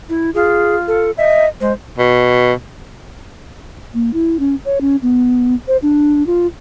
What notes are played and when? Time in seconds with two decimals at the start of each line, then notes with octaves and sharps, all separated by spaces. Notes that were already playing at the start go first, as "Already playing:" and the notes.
0.09 E4
0.34 F4 G#4
0.88 A4
1.17 D#5 E5
1.61 G#3 C5
1.99 B2
3.94 A#3
4.14 E4
4.40 C#4
4.65 C#5
4.81 C#4
5.02 B3
5.68 C5
5.82 D4
6.27 F4